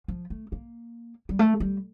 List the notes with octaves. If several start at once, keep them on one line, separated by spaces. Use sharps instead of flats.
F3
A3
A#3
G3
A3
G3